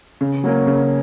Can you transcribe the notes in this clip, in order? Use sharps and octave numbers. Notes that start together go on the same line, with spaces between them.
C#3
F#3 A#3 C#4
C#3